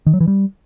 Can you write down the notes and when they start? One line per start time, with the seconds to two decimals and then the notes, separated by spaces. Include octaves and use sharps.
0.06 D#3
0.14 F#3
0.21 E3
0.28 G3